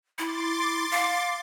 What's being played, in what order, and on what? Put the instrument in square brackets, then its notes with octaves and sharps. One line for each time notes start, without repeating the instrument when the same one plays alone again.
[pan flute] E4 [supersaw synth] C6 D6 A6
[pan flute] F5